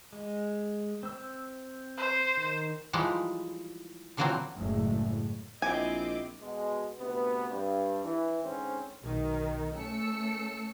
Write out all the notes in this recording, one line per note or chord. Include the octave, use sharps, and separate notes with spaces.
G#3
C4 E6
C5
D#3
E3 F3 G3 G#3 D#4
A#2 D3 E3 F#3 A#3 C4
F#1 A2 G#3
A#1 C4 E4 D#5 G#5 D6
B2 G#3
D2 C3 B3
G2
E3
G#2 D3 C4 C#4
B1 D#3
A3 C#4 A4 E6 C#7